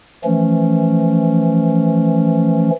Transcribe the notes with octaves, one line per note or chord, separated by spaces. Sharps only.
E3 F3 A3 C#4